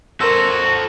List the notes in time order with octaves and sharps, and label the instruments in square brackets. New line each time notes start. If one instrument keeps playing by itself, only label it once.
[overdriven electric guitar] F#4 [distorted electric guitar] A4 C5 [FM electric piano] A#4 E6